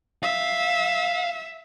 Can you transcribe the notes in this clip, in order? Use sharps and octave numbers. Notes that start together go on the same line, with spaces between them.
E5 F5